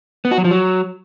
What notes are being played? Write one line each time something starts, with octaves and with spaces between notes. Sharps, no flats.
B3
F#4
F#3
F3
F#3